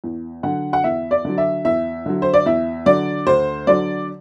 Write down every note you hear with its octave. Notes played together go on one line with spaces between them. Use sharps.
E2
D3 F#3 F#5
F#5
E2 E5
D5
D3 F#3
E5
E2 E5
D3 F#3
C5
D5
E2 E5
D3 F#3 D5
D2 C5
D3 F#3 D5